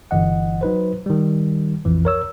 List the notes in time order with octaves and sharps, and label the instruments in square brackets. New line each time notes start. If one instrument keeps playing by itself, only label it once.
[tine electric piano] G1 E3 D#5 F#5
F#3 D#4 B4 C5
D#3 G3
A#1 F2 E3
A#4 C#5 E6